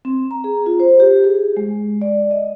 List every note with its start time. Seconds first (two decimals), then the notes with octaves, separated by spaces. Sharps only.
0.05 C4
0.31 A#5
0.44 G#4
0.66 F4
0.80 C5
1.00 G4
1.24 G#4
1.57 G#3
2.01 D5
2.31 D#5